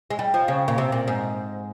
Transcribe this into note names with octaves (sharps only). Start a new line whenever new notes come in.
G#3
G3
F3
C#3
A#2
C3
A#2
G#2